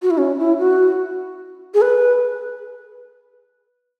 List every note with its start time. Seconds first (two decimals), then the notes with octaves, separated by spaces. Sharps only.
0.02 F#4
0.10 E4
0.18 C#4
0.39 E4
0.59 F#4
1.74 G#4
1.81 B4